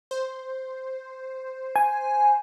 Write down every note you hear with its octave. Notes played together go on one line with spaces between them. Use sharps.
C5
G#5